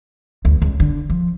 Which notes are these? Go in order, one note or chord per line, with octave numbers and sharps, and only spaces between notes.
D2
C#2
D3
F3